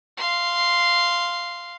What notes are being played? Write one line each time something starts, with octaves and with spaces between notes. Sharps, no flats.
F5 C6